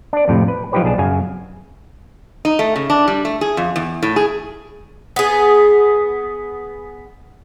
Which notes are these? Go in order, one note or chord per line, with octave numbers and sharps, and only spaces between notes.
D4 D5
F2 A2 C3
B4
F3 F#3 D#4 G4 B4 C#5
B1 D4 G#4 A5
F#2 C#3 F5 G#5
D#4
A3
C#3
D4
G3
A3
G#4
F2
E2
A2
G#4
B3 G#4